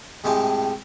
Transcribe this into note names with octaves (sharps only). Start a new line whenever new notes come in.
C2 A2 G#3 G4 G#5 A5